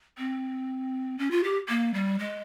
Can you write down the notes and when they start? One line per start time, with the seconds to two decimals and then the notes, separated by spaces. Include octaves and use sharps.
0.18 C4
1.18 C#4
1.31 F4
1.44 G4
1.69 A#3
1.94 G3
2.19 G#3